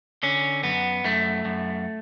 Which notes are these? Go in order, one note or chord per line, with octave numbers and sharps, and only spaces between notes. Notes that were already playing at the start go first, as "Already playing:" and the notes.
D3 C#4
F#2 B3
F#2 A3
F#2